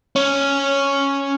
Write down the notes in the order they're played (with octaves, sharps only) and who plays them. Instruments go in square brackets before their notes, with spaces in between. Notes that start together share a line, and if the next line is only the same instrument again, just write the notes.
[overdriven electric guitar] C#4